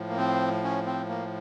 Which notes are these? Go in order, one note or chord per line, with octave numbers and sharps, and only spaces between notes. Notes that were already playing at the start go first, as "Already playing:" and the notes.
Already playing: A2 F3
A#3
C4
C#4
C4
A#3